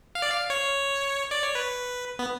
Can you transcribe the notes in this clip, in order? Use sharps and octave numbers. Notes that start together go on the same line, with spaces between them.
F5
D5
F5
C#5
D5
C#5
B4
B3